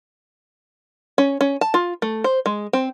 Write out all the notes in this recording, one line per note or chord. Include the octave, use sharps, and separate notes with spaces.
C#4
C#4
A5
F4
A3
C5
G#3
C4